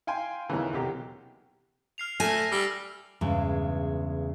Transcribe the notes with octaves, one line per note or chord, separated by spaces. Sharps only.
F5 G5 G#5 C6
D#2 C#3 E3
B1 C3 G4 A#5
F6 C7 F7
A3 G#5 F6 A#6
G3 E6
E2 G2 C#3 G#3